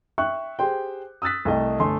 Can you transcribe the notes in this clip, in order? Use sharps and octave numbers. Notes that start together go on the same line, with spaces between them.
E5 G5 C#6 F#6
G4 G#4 C5 G5
D#6 E6 F#6 A6 B6
C2 A3 D#5
G1 A3 G#5 C6